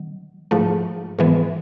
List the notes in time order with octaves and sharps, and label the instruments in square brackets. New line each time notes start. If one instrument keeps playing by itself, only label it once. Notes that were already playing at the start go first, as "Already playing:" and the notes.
Already playing: [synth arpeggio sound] D#3 F#3
G#2 F3 A3
G#2 E3 G#3 B3